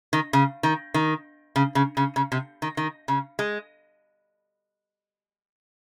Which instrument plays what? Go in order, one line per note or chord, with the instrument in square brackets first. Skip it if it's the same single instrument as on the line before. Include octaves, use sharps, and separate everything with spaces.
[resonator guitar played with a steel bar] D#3
C#3
D#3
D#3
C#3
C#3
C#3
C#3
C3
D#3
D#3
C#3
G#3